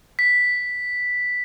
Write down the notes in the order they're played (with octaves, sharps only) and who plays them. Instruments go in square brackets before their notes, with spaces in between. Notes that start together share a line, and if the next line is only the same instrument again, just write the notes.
[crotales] B6